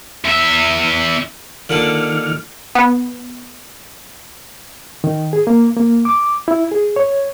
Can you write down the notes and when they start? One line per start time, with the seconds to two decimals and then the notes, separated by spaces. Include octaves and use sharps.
0.25 E2 E5
1.69 A#2 D3 D#3 D4 F6
2.75 B3
5.04 D#3
5.33 G#4
5.47 A#3
5.77 A#3
6.05 D6
6.48 E4
6.71 G#4
6.96 C#5